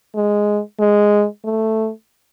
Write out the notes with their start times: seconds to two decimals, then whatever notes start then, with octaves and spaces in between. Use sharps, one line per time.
0.15 G#3
0.80 G#3
1.45 A3